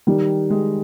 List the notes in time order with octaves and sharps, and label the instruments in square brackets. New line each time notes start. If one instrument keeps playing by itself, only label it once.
[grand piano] D#3 [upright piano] G3
[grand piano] G#3